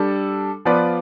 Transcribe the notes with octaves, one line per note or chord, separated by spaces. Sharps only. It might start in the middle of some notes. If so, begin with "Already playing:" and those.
Already playing: G3 D4 A4
F3 B3 F4 B4 D5